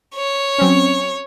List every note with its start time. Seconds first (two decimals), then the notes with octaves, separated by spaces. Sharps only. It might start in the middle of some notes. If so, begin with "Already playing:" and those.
0.15 C#5
0.58 F#3 C4 C#4